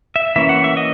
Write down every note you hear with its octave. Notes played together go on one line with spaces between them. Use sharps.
E5
E3 A#3 C#4 E5
F#5
E5
D#5